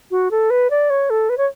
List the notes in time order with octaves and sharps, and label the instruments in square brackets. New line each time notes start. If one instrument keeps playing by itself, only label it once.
[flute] F#4
A4
B4
D5
C#5
A4
B4
C#5